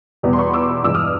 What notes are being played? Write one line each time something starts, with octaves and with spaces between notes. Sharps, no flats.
E2 B2 G3 B3
C6
B5 C#6
D6 E6
G2 E3 G#3 D6 E6
D#6 F6